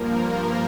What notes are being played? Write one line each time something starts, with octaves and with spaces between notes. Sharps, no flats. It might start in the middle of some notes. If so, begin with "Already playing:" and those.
Already playing: G2 F3 A#3 A#4